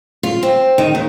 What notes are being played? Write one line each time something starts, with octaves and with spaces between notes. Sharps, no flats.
F4
C4
D#3
D#2